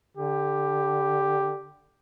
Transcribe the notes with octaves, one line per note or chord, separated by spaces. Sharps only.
D3 G4